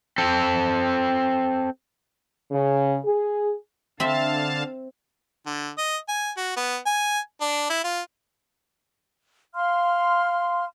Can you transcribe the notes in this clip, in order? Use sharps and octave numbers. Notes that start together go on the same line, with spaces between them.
C4 A4
C#3
G#4
D3 C4 E5 F5 A5
D3
D#5
G#5
F#4
B3
G#5
D4
E4
F4
F5 C6 F6